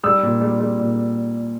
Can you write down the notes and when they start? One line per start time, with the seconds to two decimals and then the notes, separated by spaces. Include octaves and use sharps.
0.03 G3 E6
0.23 A#2
0.41 G3
0.60 G3
0.79 A#2